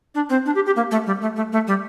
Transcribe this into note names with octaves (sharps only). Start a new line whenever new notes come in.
D4
C4
D4
G4
G4
A#3
A3
G3
A3
A3
A3
G3